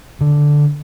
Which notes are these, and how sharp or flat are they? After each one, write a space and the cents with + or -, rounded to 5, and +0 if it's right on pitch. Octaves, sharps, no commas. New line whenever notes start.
D3 +0